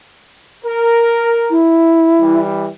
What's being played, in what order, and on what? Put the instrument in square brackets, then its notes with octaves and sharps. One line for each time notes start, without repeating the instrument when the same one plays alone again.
[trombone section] A#4
[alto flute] E4
[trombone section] E3 G3